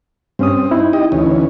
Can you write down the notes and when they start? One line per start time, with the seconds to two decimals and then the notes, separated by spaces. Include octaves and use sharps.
0.39 G2 C4 C#4 D#6
0.71 D#4 E4
0.93 G4 D#5
1.12 D2 E3 C#4